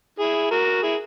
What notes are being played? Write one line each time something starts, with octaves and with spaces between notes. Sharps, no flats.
E4 G#4
F#4 A#4
E4 G#4